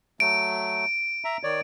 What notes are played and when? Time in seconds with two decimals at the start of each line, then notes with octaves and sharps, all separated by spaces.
0.20 F#3 A3 D7
1.25 E5 A#5
1.43 D#3 C#5 D5